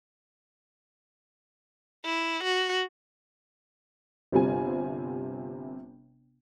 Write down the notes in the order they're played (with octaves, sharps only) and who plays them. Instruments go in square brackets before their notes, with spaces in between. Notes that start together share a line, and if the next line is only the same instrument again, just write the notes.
[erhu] E4
F#4
[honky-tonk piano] G1 C3 G3 C4 F4 G#5